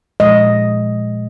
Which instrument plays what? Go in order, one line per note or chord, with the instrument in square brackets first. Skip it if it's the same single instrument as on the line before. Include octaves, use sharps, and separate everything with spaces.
[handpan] A#2 F3 G#3 D#5